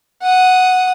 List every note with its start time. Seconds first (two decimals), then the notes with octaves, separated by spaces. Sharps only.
0.22 F#5 D#6